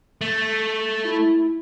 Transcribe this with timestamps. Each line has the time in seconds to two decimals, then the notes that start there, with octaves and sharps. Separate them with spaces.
0.21 A3
1.05 E4